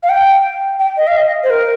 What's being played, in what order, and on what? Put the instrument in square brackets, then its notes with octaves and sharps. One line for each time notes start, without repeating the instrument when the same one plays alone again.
[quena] F5
G5
G5
D#5
F5
D#5
C5
A#4